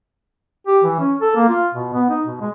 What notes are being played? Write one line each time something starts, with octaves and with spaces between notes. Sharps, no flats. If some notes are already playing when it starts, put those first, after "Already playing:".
G4
E3
C#4
A4
A#3
F4
B2
B3
D#4
B2
G#3